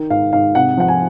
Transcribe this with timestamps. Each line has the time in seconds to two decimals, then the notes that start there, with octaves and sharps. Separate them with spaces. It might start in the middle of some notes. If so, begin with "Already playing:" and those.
Already playing: D#3
0.10 G#2 F5
0.33 G#2 F5
0.55 C3 F#5
0.77 F3 F#5
0.88 G#5